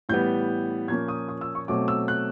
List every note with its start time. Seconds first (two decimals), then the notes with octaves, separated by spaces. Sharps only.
0.09 A2 E3 G3 B3 G6
0.88 A#2 F3 A#3 C#4 G#6
1.08 D#6
1.29 D#6
1.41 E6
1.55 C#6
1.68 B2 F#3 A3 C4 D6
1.88 E6
2.08 F#6